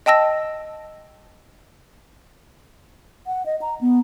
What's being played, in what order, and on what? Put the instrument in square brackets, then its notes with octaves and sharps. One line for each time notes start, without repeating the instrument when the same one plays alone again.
[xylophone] D#5 G5 A5 E6 A#6
[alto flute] F#5
D#5
A#5
B3